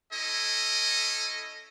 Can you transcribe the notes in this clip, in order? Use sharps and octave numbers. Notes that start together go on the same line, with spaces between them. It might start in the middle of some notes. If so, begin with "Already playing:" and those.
C#4 E4 A4 D#5